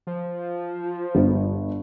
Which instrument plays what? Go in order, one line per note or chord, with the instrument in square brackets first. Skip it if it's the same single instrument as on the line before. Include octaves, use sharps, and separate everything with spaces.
[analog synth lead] F3
[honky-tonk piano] G1